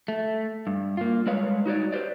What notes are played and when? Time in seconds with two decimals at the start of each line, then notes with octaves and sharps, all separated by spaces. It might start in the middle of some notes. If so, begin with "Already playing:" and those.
0.08 A3
0.67 G2
0.97 A#3 F4
1.26 G3 G#3 B4 C#5 F5
1.66 D#4 F#4 C#5 D5
1.93 G4 B4 C5 D5